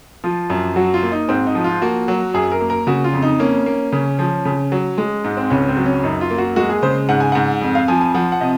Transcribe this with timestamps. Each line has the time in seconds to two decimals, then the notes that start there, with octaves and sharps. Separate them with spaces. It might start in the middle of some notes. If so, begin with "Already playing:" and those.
0.24 F3 F4
0.50 F#2
0.76 F#3 F#4
0.94 F4
1.03 A#3
1.12 D#4
1.29 G#2 C4
1.47 D#4
1.55 F3
1.64 F4
1.82 A#3 F#4
2.08 F#3
2.34 F#2 G#4
2.52 A#4
2.61 A#3
2.70 A#4
2.87 C#3 F#4
3.04 F4
3.13 F2
3.22 D#4
3.39 A#3 C#4
3.66 A#3
3.92 C#3 C#4
4.19 F3
4.45 C#3
4.72 F#3
4.98 G#3
5.25 G#2
5.37 C4
5.50 C#2 C#4
5.68 C4
5.77 F#3
5.86 C#4
6.03 F#2 D#4
6.21 F4
6.30 A#3
6.38 F#4
6.56 G#3 F#4
6.70 G#4
6.83 C#3 C5
7.09 G#2 F#5
7.20 G#5
7.32 G#2 F#5
7.61 F2
7.75 F5
7.88 F3 G#5
8.01 G#5
8.14 F3 F#5
8.32 F#5
8.40 C3 D#5